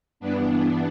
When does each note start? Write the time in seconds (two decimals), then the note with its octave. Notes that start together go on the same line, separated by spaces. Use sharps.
0.20 G2 E3 B3 D4